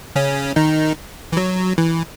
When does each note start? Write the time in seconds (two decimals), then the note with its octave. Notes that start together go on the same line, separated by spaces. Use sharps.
0.16 C#3 C#4
0.56 D#3 D#4
1.32 E3
1.37 F#3
1.78 E3